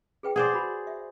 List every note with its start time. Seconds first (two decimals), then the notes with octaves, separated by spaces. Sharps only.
0.23 G#4 B4 G5
0.36 G#4 C5 D5 F#5
0.53 F#4 B5
0.87 E5